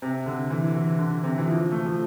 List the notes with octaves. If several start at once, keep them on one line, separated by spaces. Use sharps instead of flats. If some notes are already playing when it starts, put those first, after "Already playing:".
C3
D3
E3
E3
D3
C3
E3
F3
A3
F3